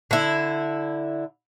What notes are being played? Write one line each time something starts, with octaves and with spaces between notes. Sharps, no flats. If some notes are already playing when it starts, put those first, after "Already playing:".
D3 E4